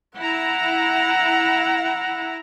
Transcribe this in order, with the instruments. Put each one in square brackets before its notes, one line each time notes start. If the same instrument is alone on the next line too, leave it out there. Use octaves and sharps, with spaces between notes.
[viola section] E4 A#5 [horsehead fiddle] F#5